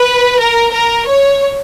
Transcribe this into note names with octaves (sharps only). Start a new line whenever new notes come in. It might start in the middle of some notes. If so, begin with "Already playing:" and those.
Already playing: B4
A#4
A#4
C#5